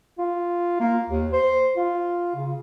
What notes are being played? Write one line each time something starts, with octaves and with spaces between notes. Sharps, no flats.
F4
A#3
D#2
C5
F4
C#3